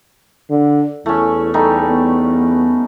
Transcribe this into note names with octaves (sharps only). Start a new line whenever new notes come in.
D3
E2 A3 C#4 E4
G3 A3 D#4 A4
B3